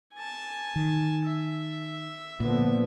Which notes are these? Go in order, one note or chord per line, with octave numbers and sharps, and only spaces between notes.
G#5 A5
D#3
E5
A#2 D3 F3 B3